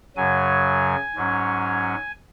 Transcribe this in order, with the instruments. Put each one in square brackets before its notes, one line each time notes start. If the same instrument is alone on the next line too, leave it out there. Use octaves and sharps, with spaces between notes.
[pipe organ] F#2 C#3 F#3 G#5
G#2 F#3 C#4